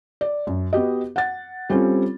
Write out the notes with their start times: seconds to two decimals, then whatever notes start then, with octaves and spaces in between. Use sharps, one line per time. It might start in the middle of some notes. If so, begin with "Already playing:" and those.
0.21 D5
0.47 F#2
0.73 B3 F#4 G4 D#5
1.16 F#5 A6
1.70 G3 C4 C#4 F4 A4